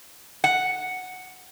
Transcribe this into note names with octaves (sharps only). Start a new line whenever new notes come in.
F#5